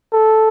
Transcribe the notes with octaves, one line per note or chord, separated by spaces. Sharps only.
A4